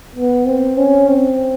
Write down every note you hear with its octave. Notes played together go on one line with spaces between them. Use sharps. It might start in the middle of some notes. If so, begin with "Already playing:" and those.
B3
C4
C#4
C4